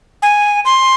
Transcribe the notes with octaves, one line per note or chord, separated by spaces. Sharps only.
G#5
C6